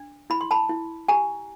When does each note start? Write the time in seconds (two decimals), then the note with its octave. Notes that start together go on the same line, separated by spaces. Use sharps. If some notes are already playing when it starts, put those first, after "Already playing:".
Already playing: D4
0.30 E4 B5
0.41 C6
0.51 A5 B5
0.69 E4
1.08 G4 G#5 A#5